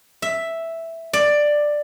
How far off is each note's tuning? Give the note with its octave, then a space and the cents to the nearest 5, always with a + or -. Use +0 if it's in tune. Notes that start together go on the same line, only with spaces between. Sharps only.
E5 +0
D5 +10